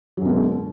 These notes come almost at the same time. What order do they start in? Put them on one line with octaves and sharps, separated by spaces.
F#3 F#2 B2 G#3 D3